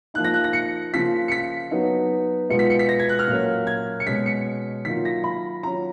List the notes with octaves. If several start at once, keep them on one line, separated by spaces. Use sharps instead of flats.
F3 A#3 D#4 F#6
A#6
F#6
A#6
C#7
C#3 F3 A#3 F4 B6
C#7
B6
F#3 B3 D#4
B2 G#3 B3 F4 C#7
B6
C#7
B6
A#6
G#6
F#6
F6
A#2 F#3 A#3 C#4
G#6
C#7
B2 G#3 C#4 B6
C#7
D#3 F#3 A#3 F4 B6
A#6
B5
F#3 C#4 F4 A#5